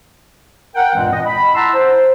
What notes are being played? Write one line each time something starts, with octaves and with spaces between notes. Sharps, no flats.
A#4 F#5 G5
C#2 G2 A#2 E3 G#3 C4
D#5
B5
E4 F#5 A5 A#5 C6 E6
C5